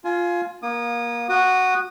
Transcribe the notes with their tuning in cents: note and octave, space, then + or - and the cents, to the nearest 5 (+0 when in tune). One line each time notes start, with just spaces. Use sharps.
F4 +0 G#5 +25
A#3 +25 D#6 -25
F#4 +0 D#6 -25